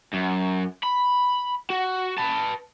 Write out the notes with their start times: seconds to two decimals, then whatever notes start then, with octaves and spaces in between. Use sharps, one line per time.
0.14 F#2
0.84 B5
1.70 F#4
2.18 B4 A5